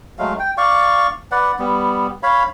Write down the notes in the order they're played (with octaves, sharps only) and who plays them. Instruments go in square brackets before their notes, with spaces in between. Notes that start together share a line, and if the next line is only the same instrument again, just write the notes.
[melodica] F#3 G#3 A3 F5
G5
D5 F5 C#6
B4 D5 F#5
G3 B3
C#5 F5 B5